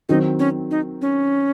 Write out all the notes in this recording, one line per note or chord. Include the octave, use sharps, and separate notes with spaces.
D#3 F#3 C4 D#4
C#4
D#4
C#4